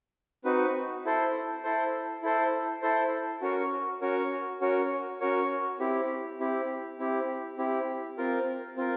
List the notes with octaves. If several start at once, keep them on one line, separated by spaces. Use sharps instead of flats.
C4 D#4 F#4 B4
E4 A4 C5
E4 A4 C5
E4 A4 C5
E4 A4 C5
C#4 F#4 A#4 C#5
C#4 F#4 A#4 C#5
C#4 F#4 A#4 C#5
C#4 F#4 A#4 C#5
C4 E4 G4
C4 E4 G4
C4 E4 G4
C4 E4 G4
C4 F4 A#4
C4 F4 A#4